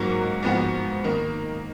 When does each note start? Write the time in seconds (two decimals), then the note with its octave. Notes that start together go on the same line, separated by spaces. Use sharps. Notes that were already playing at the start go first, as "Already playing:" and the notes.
Already playing: G#2 F#3 A#3 D#4 F#4
0.43 G#2 F3 B3 F#4
1.04 D#3 A#3 D#4